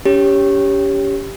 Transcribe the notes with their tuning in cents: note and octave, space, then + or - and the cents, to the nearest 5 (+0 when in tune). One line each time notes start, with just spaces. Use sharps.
C#4 +35 G4 +5 C#5 +0